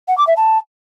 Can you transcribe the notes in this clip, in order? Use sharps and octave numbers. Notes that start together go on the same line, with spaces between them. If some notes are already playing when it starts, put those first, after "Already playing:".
F#5
D6
E5
A5